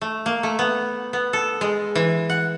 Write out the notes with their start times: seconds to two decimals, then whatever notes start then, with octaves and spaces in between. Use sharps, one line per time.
0.01 A3
0.26 A#3
0.43 A3
0.59 B3
1.13 B3
1.33 A4
1.61 G#3
1.95 E3
2.30 F#5